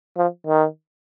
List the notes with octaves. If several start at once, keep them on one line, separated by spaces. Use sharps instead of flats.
F3
D#3